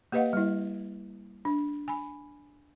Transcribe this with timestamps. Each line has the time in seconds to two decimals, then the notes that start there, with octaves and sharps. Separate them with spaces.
0.12 A#3 G4 B4 D#5 F5 F#5
0.33 G3 E4
1.45 D4
1.88 G#5 B5